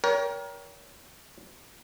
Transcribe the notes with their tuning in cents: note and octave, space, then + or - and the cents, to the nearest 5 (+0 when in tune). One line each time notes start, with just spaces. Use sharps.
A#4 +25 C#5 +35 G5 +0